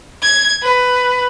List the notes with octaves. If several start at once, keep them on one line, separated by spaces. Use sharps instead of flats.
G#6
B4